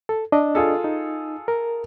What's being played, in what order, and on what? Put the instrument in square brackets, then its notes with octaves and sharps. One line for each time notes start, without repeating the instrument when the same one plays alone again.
[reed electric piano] A4
D4 D#5
[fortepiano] F4 G#4 A4
[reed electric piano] D#4
A#4